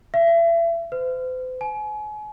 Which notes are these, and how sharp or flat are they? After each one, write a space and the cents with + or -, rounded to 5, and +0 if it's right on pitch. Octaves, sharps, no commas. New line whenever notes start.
E5 +35
C5 -45
G#5 +35